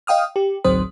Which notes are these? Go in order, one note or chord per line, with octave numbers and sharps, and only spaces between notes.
D#5 F5 G5 D#6 F6
G4
A1 D2 F#3 C4 C5 D#6